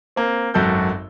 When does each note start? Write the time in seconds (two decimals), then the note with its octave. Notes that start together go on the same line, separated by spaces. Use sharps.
0.16 A#3 C4
0.54 G#1 F#2 F#4 A4 G6